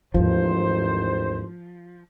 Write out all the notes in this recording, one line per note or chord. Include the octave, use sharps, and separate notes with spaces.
A1 D#2 G#2 D#3 F3 C5